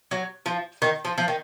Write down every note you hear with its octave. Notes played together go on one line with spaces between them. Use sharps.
F#3
F3
D#3
F3
F3
D#3